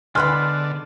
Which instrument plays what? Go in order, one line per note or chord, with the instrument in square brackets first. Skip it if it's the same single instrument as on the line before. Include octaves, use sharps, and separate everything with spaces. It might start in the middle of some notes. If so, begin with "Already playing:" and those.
[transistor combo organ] D3 [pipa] G#3 B4 F#5 [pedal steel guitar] B3 F6 F#6 [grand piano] C6